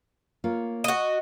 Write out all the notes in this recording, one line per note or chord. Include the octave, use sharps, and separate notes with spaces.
A#3 F4 C#5
F#4 D#5